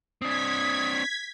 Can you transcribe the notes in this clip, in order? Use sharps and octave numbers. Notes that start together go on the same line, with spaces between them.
C4 D4 D#6 G#6 B6